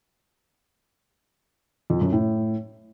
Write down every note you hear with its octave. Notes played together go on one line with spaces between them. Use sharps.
F2
F#2
A2